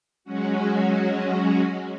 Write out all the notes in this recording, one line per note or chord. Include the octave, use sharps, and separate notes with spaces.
F#3 G#3 C#4 F#4